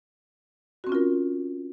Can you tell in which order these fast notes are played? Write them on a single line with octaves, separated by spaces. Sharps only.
F#4 C4 C#4 F4 A#4